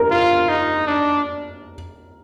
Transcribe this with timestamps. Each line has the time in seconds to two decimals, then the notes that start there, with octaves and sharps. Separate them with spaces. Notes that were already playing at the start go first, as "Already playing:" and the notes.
Already playing: A#4
0.11 F4
0.49 D#4
0.87 D4